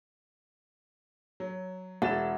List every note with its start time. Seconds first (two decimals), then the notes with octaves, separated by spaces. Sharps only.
1.40 F#3
2.02 E1 F#4 E5 F#5 A6 E7